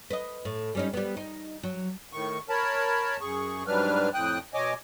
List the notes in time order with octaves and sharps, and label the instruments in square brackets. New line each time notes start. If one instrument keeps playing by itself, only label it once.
[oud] B4 D#5
A2
G3 C#4 D#4
G3 B3
D#4
F#3
[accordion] A2 D#3 C#6
A#4 C#5 A5 B5
F#2 G#4 C#6
G#2 F#3 G3 D4 B4 F6
F2 A2 G5 D#6 F#6
B2 C#5 D#5 G#5 D6